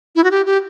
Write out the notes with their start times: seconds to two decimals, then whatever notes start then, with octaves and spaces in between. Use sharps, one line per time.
0.16 E4
0.24 F#4
0.31 G4
0.46 G4